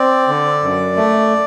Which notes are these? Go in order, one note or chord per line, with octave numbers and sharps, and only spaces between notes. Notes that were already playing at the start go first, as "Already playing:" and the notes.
Already playing: C4 D5
D3
F#2
A3